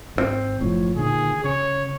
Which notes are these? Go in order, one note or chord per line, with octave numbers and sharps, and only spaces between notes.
G#1 D3 C4
F#1 A2 F3 C#5
A#2 D3 D#3 G#4
C#3 C#5